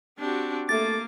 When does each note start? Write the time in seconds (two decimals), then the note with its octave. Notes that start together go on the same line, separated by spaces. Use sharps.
0.19 C4 D4 F#4 G4
0.69 A3 A#3 D6 A6